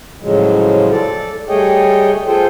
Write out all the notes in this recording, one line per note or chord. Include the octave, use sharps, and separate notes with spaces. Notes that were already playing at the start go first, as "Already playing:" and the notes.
A2 C#3 F3 F#3 G#3
A4 D5
G3 A3 G#4 C#5 D#5 G5
F4 G#4 A4 C5 G5